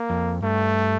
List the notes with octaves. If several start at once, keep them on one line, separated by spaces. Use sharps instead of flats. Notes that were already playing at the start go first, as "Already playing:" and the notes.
Already playing: A#3
F2
G2 A3